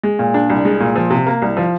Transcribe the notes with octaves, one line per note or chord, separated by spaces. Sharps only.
G#3
A#2
D4
C2
G#3
A#2
F3
C3
A#3
C2
F3